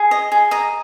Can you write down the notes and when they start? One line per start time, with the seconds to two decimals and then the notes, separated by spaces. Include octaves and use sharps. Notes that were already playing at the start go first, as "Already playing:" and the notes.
Already playing: G#4
0.11 D#5
0.32 G#4
0.51 D#5 A#5